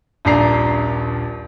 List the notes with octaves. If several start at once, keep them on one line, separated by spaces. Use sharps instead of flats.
D#1 A#1 D4 A#5 C7